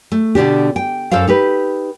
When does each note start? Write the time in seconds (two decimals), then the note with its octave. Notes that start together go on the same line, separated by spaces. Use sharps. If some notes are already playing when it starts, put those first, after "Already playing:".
0.12 A3
0.35 B2 D3 D4 G4
0.76 G5
1.11 F#2 A4 A#4 C5 F5
1.27 D#4 G4 B4